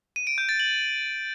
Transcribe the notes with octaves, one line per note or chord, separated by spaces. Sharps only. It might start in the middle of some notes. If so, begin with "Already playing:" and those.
D#7
D7
G6
A6
F#7